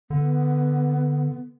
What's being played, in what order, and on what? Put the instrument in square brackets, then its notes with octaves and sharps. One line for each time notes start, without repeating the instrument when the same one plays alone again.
[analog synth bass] D3 [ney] B3